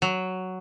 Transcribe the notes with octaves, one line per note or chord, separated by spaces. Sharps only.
F#3